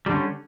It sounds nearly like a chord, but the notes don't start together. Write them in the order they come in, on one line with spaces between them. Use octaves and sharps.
G3 D3 C#4